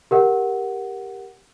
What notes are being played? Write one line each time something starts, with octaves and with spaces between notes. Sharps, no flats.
G4 A#4 F#5